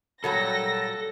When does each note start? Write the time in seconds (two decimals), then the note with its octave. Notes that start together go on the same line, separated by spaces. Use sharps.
0.24 A#2 F#3 G3 A4 A#6